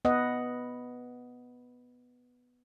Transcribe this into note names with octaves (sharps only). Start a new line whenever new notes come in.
B3 B4 D#5 F#5